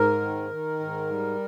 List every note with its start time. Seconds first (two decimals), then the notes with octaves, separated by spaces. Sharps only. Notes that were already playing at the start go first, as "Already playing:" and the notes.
Already playing: G#2 A#4
0.21 D#3
0.50 D#3
0.80 G#2
1.10 G3